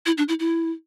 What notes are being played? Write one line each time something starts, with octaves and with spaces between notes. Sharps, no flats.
E4
D4
E4
E4